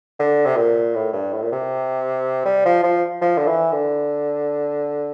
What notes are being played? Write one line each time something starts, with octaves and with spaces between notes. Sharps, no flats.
D3
C3
A#2
A2
G2
A2
A#2
C3
G3
F3
F3
F3
D3
E3
D3